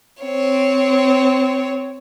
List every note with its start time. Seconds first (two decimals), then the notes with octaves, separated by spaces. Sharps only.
0.22 C4 C#5